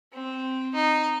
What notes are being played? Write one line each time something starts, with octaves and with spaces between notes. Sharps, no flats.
C4
D#4